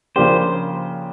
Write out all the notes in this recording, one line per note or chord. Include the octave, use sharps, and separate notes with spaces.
C#3 F3 A#3 D4 G4 C5